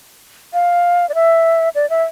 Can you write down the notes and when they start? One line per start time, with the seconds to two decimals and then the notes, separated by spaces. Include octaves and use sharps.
0.54 F5
1.09 D5
1.15 E5
1.75 D5
1.90 E5